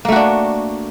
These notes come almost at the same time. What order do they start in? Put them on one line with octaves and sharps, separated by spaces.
A#3 A3 F#4 D4